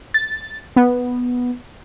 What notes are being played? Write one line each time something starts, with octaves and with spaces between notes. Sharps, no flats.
A6
B3